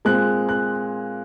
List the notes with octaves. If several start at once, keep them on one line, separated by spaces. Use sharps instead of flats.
A#2 G#3 C4 F#6
F#6